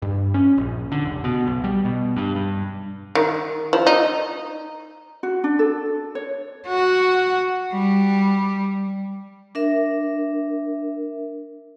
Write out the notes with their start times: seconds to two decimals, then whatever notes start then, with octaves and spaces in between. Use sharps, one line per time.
0.02 G2
0.34 C#4
0.58 A#1
0.92 D3
1.05 F1
1.24 B2
1.47 B1
1.64 G3
1.85 B2
2.16 G2
2.36 G2
3.15 D#3
3.73 F3
3.87 D#4
5.23 F#4
5.44 D4
5.59 A4
6.15 C#5
6.68 F#4
7.73 G3
9.55 D4 A#4 E5